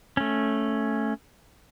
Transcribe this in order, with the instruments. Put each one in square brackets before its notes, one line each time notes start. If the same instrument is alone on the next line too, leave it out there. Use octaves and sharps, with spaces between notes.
[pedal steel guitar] A3 C#4